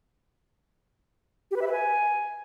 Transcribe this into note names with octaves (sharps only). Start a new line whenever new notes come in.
G4
B4
E5
B4
G#5